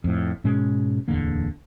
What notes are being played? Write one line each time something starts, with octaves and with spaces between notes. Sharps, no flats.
F2 A2
G#2 B2 G#3 C#4
D1 E2 D3 A#3